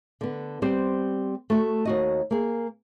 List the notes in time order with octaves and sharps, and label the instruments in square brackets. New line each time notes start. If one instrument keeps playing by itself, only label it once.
[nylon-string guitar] D3 B3
G3 B3 C4 G4 C5
A3 F#4
D#2 F#4 D#5
A#3 G#4